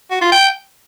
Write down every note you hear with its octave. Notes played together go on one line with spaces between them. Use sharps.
F#4
F4
G5